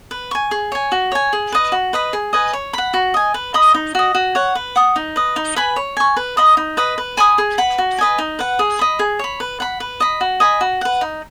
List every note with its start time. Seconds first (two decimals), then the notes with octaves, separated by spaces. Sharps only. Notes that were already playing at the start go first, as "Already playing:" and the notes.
0.11 B4
0.31 G#5 C#6
0.51 G#4
0.72 C#5 G#5
0.92 F#4
1.12 C#5 G#5
1.33 G#4
1.52 B4 D#5
1.72 F#4
1.93 B4 D#5 B5
2.13 G#4
2.33 B4 D#5 G#5
2.53 C#5
2.73 F#5 B5
2.94 F#4
3.14 D#5 G#5
3.34 B4
3.54 D#5 B5 D#6
3.74 D#4
3.95 F#4 D#5
4.15 F#4
4.35 C#5 F#5
4.55 B4
4.76 F#5 D#6
4.96 D#4
5.16 B4 D#5
5.36 D#4
5.56 B4 G#5 B5
5.76 C#5
5.97 G#5 C#6
6.16 B4
6.37 D#5 B5 D#6
6.57 D#4
6.77 B4 D#5 B5
6.98 B4
7.17 G#5 B5 D#6
7.38 G#4
7.58 B4 F#5 B5
7.78 F#4
7.98 B4 D#5 G#5
8.18 D#4
8.39 B4 F#5
8.59 G#4
8.79 D#5 B5
8.99 G#4
9.19 C#5 B5
9.40 B4
9.60 F#5 B5
9.80 B4
10.00 D#5 B5
10.21 F#4
10.40 D#5 G#5 B5
10.61 F#4
10.81 B4 F#5
11.01 D#4